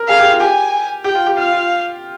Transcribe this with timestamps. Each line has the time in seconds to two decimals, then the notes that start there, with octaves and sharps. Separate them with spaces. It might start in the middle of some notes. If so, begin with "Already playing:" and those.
Already playing: A#4
0.09 G#4 F5
0.20 G4
0.31 F4
0.40 G4 G#5
1.04 G4 G5
1.15 F4
1.26 G4
1.37 F4 F5
1.53 F4